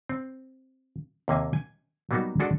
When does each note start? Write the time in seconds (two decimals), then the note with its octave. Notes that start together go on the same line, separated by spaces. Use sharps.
0.09 C4
1.28 D#2 C3 A#3 G#5
1.53 G#5
2.11 F#3 G3 A#3 B3 D#4 F#4
2.40 G#3 D4 F#4 A4 D5